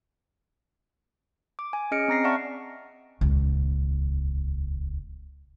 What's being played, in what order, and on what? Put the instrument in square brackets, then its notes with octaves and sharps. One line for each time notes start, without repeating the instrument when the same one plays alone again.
[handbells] D6
G#5
C#4 G#4 D#5 F6 C#7 D7
C4 A#5 A#6 C7
D5 E5 F#5 A5 C#6 F6
[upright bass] D#1 C#2